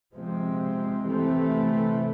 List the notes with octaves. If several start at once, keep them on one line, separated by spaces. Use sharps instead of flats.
C3 F3 G#3 C4
C3 E3 A3 C4